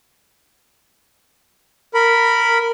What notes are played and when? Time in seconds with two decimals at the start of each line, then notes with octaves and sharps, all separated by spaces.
1.94 A#4 B5